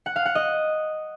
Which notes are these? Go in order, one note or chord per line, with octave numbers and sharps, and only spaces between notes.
F#5
F5
F#5
D#5